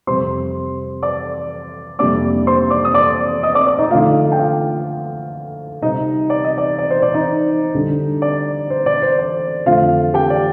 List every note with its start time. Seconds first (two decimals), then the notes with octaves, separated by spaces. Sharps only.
0.07 F2 C3 G3 C5 C6
1.03 D5 D6
1.99 F2 C3 G3 A#3 D4 D5 D6
2.47 C5 C6
2.70 D5 D6
2.85 D#6
2.94 D5 D6
3.43 D#5 D#6
3.55 D5 D6
3.67 D5 D6
3.79 D#4 D#5
3.90 D3 F3 A3 C4 F4 F5
4.32 G5
4.38 F4 F5
5.82 C3 G3 C4 D#4 D#5
6.30 D5
6.44 D#5
6.58 D5
6.78 D5
6.91 C5
7.02 D5
7.14 D#4 D#5
7.75 D3 G3 D4
8.22 D5
8.70 C5
8.86 D5
9.02 C5
9.18 D5
9.66 F2 D3 A3 C4 F4 F5
10.14 G4 G5
10.30 D5